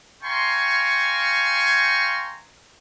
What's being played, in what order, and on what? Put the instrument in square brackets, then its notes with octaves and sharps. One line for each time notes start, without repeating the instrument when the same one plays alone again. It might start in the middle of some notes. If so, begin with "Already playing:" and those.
[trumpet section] F5 G5 G#5 A#5 C6 C#6